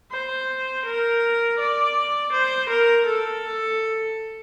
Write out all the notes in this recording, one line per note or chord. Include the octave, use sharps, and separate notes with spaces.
C5
A#4
D5
C5
A#4
A4